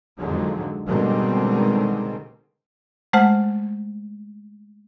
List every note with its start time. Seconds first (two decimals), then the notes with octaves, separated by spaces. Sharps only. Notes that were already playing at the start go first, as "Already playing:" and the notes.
0.18 F2 D3 D#3 F#3 G#3
0.87 B2 D3 D#3 G3 G#3 C4
3.13 G#3 A3 C5 F#5 F6